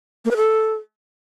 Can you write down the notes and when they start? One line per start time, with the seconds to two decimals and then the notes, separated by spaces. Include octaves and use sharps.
0.25 A#3
0.31 B4
0.37 A4